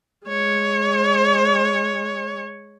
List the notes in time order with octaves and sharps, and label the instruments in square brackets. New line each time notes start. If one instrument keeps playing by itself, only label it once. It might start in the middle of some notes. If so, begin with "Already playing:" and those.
[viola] G#3 C#5